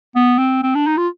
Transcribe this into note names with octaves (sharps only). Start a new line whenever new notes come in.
B3
C4
C4
D4
D#4
F4